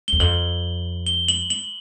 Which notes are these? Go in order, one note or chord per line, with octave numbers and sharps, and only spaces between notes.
E2 G7
F2 F#7
G7
F#7
F#7